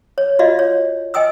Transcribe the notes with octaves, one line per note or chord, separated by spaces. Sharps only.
C#5
F4 F#4 D5 D#5 F5
C#5
D#5 G5 G#5 D#6 E6